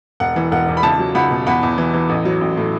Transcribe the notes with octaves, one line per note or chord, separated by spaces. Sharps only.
E1 F#5
E3
E1 F#5
E2
B5
C#2 A5
F#3
C#2 F#5 B5
B2
E2 F#5 B5
E2
E3
E3
A1
F#3
A1
A2